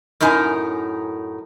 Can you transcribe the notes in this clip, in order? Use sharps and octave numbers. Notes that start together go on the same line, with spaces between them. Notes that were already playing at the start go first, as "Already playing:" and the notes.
F#2 A2 D#4 A#4 G#5